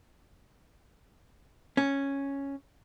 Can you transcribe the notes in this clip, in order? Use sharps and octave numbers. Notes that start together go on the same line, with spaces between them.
C#4